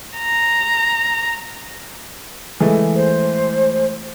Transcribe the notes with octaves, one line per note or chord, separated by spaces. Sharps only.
A#5
E3 G#3 A3
C5